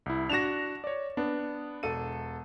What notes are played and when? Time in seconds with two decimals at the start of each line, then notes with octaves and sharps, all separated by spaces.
0.06 C2 E4
0.29 D4 F#4 A#6 E7 F7
0.84 C#5 D5
1.17 B3 D4
1.83 E1 A4 D#7